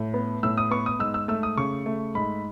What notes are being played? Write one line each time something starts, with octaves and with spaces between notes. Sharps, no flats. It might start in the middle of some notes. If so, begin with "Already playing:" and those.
Already playing: A2
B3
A2 E6
D#6
B3 C#6
D#6
G#2 E6
E6
A3 E6
D#6
C#3 C#6
A3
G#2 B5